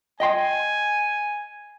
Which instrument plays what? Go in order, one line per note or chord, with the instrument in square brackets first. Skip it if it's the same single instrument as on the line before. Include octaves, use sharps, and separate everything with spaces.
[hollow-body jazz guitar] D#5 G5 C6 [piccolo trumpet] G#5